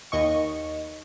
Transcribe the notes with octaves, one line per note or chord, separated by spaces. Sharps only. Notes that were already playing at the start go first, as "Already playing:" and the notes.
D#2 D#5 C#6